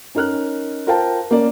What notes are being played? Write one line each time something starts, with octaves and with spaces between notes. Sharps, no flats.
C#4 D#4 A#4 F6 F#6
F4 A#4 C5 F5 G5 A5
A#3 C#4 A#4 D5